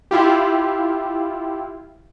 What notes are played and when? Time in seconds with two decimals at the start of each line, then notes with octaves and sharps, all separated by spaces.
0.11 E4 F4 G4